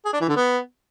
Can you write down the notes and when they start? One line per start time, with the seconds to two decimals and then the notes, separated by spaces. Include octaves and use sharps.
0.05 G#4
0.13 D4
0.21 E3
0.28 D3
0.36 B3